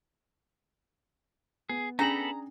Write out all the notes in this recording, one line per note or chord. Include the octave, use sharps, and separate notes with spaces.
B3 G#4
B3 C#4 D4 G#4 A4 G#5 A#5 B5